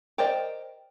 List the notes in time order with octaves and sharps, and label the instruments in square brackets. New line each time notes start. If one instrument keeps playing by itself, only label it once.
[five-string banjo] G4 A#4 C5 D5 D#5